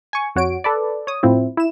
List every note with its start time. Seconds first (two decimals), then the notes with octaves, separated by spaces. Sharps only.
0.13 G#5 C#6
0.36 F2 F#4 C#5 D7
0.64 A4 B4 D5
1.07 C#5 D#6
1.23 A2 F3 C4 E4
1.57 E4 E7